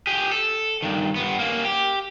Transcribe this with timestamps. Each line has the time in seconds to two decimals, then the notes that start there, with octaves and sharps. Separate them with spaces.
0.07 G4 G#4
0.31 A4
0.82 G2 D#3
1.16 G2 B3
1.39 A#3 C#4
1.65 G4